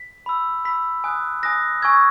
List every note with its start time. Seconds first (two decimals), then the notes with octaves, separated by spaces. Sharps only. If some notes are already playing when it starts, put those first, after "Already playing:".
Already playing: B6
0.26 B5 E6
0.65 B5 E6 B6
1.04 G#5 D#6 F#6
1.43 G#5 D#6 F#6 A#6
1.82 G#5 C#6 E6 G#6